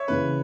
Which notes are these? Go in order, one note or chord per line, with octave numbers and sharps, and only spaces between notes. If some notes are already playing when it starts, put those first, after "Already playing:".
Already playing: C#5 E5
C#3 E3 C#4 B4